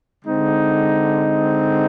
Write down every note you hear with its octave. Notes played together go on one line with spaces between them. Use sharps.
D3 G#3 C4 D#4